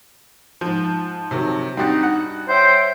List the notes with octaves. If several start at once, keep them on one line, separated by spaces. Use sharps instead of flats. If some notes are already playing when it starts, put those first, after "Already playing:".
G#2 F3
C3 D#3 F#3
G2 C4 D#4 F#4 G4 F#5 A6
F#5
C5 C#5 E5 G5